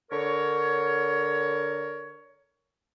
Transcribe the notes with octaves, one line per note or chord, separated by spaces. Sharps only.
D3 A#4 C#5